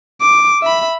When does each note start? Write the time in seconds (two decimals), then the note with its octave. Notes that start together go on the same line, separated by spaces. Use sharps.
0.21 D6
0.62 E5 B5